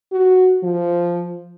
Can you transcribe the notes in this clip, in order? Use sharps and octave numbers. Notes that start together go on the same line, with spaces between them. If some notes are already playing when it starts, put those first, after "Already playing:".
F#4
F3